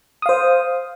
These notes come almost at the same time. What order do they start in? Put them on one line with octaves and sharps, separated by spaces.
D#6 F5 C5